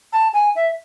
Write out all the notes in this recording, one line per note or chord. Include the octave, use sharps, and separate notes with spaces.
A5
G#5
E5